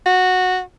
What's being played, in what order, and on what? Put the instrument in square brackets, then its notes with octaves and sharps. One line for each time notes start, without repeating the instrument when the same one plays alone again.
[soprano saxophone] F#4